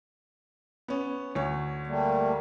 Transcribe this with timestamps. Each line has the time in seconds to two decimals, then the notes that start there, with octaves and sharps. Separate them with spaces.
0.88 B3 C#4
1.35 D2 C#5
1.87 G3 A3 A#3